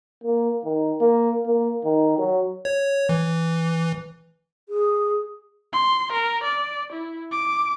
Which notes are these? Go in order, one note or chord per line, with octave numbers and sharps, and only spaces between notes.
A#3
D#3
A#3
A#3
D#3
F#3
C#5
E3
G#4
C6
A#4
D5
E4
D6